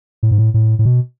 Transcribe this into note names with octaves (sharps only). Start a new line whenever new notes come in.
A2
G#2
A2
A2
A2
B2